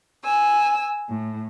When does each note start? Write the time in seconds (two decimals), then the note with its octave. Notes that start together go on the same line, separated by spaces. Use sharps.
0.22 G#5 E6
1.08 A2